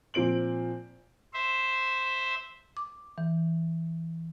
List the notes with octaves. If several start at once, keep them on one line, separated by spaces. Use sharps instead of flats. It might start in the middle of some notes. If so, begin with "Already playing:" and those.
A#2 F3 C4 D7 F#7
C5 E5
D6
E3